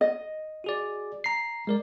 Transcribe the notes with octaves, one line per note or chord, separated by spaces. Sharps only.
D#5
F#4 G#4 D5
A#5 C7
G#3 A#4 D5